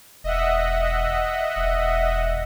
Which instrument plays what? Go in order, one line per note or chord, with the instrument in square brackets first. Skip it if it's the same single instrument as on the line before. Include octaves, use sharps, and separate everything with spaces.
[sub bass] E1 [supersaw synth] D#5 E5 F#5
[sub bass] E1